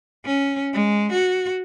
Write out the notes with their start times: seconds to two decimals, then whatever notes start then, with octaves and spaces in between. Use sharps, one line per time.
0.25 C#4
0.74 G#3
1.12 F#4